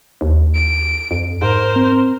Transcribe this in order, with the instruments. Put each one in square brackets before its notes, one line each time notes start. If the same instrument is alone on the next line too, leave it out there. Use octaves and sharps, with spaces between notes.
[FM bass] D#2
[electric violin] D7
[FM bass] F2
[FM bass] G#2 [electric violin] A#4 C5
[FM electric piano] C4